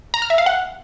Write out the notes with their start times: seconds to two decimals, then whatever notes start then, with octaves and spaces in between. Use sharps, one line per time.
0.14 A#5
0.22 F6
0.30 E5
0.38 F5
0.46 F#5